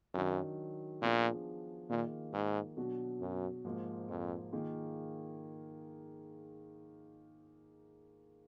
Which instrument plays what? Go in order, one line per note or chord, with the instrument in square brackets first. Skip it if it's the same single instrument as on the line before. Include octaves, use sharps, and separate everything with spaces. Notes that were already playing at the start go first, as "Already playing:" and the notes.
[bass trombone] F#2 [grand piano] D#3 F#3 D4
[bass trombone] A#2 [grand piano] F3 B3 D4 F4 G#4
[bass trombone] A#2 [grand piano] D#3 A#3 F4 G#4
[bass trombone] G#2
[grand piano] B2 F#3 D4 F#4
[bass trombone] F#2
[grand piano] G#2 F3 A#3
[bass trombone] F2
[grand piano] D#3 A#3 F4 G#4